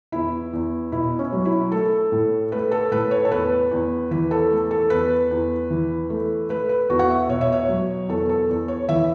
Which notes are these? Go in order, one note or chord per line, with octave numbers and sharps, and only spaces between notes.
E2 E4
E2
B2 E4
C#4
F#3
E4
A3 A4
A2
A3 B4
A4
A2 B4
C#5
A4
E2 B4
E2
E3 B4
A4
A3
A4
E2 B4
E2
E3
A3
A3 B4
B4
E2 F#4
F#5
E5
B2 C#5
E5
C#5
F#3
E2 A4
A4
E2
C#5
E3 E5